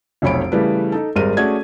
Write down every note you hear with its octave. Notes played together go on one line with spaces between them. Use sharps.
F1 B1 C#5 B5 D7
C#3 E3 G3 A3 B4
D#4 A4
G#1 G3 G#3 A#4 D#7
A3 C#4 F#4 G#4 D5 G#6